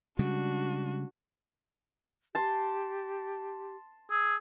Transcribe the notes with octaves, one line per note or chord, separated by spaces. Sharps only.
C#3 G3 G#3 D4 F#4
G4 A5 C6
G#4 E6